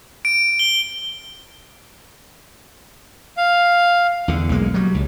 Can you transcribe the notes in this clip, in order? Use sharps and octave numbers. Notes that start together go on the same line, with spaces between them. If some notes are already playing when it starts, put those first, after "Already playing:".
D7
G7
F5
E2 D3
B1 G#3 A#3
F#3 G3
C#2